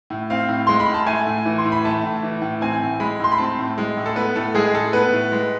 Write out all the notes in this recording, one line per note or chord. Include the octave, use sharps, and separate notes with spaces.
A2
C4 F5
A2
G#3 C6
B5
A2
A5
A3 G#5
A2
E3
C6
A2
B5
A3 A5
A2
E3
A2
C4 G#5
A2
G#3 B5
A2 C6
B5
C4 A5
A2
G#3
A2
A4
B3 B4
A2 A4
G#3 G#4
A2 A4
B3 B4
A2
G#3